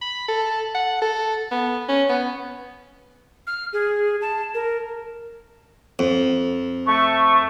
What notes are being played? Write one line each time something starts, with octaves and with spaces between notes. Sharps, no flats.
B5
A4
F#5
A4
B3
C#4
B3
F6
G#4
A5
A#4
F2
A3 C#6